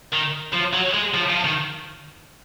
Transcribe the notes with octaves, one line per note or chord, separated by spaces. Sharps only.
D#3
F3
F#3
G#3
F3
F3
D#3